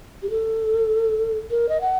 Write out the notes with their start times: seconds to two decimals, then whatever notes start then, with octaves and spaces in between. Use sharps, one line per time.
0.23 G4
0.30 A4
1.51 A#4
1.69 D#5
1.81 F#5